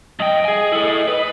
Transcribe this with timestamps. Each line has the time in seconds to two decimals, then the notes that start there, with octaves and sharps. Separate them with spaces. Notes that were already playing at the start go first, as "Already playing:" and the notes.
0.19 G2 D#5 G5
0.45 G#4 G#5
0.72 E4 A4
1.08 B4